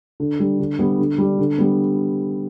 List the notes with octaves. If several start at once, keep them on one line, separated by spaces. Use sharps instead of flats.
D3
G3 D4
D3
G3 B3
D3
G3
D4
D3
G3 B3